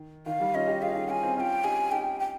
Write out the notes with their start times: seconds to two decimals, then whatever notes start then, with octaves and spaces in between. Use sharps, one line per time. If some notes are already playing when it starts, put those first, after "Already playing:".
Already playing: D#3
0.26 D#3 F5
0.40 D#3 G3
0.54 C#4 F4 D#5
0.67 D#4 G4
0.81 F4 G#4 F5
0.95 D#4 G4
1.09 C#4 F4 G#5
1.23 C4 D#4
1.36 C#4 F4 G5 G#5
1.64 D#4 G4 G#5
1.92 D#4 G4 G5
2.20 G5